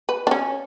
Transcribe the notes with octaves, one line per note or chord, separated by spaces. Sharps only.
B4
D4
C#4